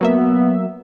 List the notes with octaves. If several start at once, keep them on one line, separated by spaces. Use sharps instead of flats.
F#3 A#3 B3 E5